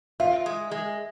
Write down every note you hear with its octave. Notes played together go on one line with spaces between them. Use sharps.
F4 E5
G#3
G#3